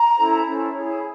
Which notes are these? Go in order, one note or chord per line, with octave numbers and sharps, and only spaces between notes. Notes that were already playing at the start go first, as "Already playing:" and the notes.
Already playing: A#5
C#4 E4 A4 C5
C#4 E4 A4 C5
E4 G#4 C#5